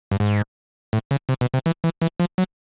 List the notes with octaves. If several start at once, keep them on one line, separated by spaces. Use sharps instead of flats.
G2
G#2
A2
C#3
C3
B2
C3
E3
E3
E3
F3
F#3